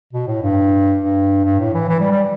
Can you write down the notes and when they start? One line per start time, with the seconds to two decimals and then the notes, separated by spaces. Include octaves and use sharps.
0.13 B2
0.28 A2
0.43 G2
1.01 G2
1.45 G2
1.60 A2
1.74 E3
1.89 E3
2.00 G3
2.11 G3